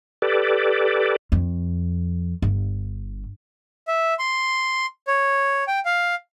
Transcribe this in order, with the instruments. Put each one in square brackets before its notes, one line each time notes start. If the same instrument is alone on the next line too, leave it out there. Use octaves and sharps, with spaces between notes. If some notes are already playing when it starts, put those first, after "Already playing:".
[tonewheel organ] G4 A4 B4 D5
[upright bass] F2
G1
[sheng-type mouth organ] E5
C6
C#5
G5
F5